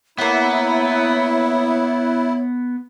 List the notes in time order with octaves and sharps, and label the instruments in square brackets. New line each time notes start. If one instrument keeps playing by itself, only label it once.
[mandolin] A#3 F#5 [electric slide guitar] B3 [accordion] E4 [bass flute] C#5